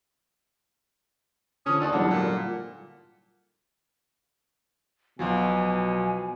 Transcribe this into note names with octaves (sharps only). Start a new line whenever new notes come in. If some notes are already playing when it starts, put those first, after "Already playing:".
D3 F3 C#4 D#6
D#2 D5
E2 G#2 F#3 G3 D4 A4 A#4 F#5
A#2
B1 B2 F3 F#3 G#5